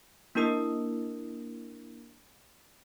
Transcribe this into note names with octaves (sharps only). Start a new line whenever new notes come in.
A#3 D4 E4 A#4 D#6 E6